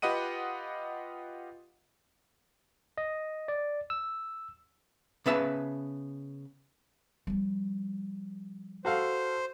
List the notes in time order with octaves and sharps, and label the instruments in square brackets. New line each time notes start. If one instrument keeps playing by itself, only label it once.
[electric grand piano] F4 G4 B4 D#5 F#5 D#7
[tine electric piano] D#5
D5
E6
[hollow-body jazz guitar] C#3 B3 B4 E5 A5
[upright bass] F3 G3
[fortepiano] F#4 A4 F5 [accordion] C5